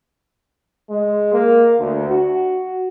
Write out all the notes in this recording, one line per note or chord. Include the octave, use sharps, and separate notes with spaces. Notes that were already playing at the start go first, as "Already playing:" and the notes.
G#3
A#3
D2
F#4